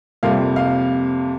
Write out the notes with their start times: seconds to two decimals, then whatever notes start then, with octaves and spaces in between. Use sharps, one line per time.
0.23 F2 C3 G3 A#3 F5
0.56 F5